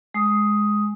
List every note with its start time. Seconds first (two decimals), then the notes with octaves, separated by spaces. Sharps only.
0.14 G#3 D#6